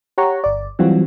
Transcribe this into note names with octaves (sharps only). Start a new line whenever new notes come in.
G4 C#5 F#5 A#5 C#6
G1 D5
E3 F#3 G3 C4 F4 F#4